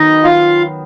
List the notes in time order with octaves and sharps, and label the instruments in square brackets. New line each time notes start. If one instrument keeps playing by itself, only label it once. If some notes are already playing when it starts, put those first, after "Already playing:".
Already playing: [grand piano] D#3 F#3 B3 [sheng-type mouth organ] D#4 D#5
[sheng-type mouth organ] F4 F5